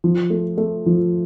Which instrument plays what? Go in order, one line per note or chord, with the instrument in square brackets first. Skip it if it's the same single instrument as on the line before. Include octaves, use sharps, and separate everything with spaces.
[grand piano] F3
A3
A3
F3